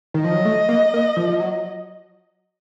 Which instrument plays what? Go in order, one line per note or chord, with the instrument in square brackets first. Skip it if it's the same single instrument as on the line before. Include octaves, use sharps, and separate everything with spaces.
[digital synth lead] D#3
[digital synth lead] F3 [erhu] D#5
[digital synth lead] F#3
A3
A#3
A#3
F3
F3
F#3